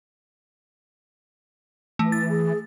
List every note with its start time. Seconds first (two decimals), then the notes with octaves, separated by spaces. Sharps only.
1.99 E3 A3
2.12 A6
2.30 G#4